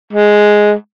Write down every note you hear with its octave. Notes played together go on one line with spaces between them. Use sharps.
G#3